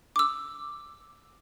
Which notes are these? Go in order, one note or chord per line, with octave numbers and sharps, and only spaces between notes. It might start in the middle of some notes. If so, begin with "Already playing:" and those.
D6 E6